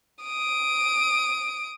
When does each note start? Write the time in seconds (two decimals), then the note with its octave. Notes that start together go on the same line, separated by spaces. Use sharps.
0.25 D#6 D7